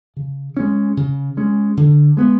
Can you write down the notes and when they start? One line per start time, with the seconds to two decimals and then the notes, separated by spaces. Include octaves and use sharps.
0.16 C#3
0.57 G#3 C#4
0.97 C#3
1.37 G#3 C#4
1.77 D3
2.17 G#3 B3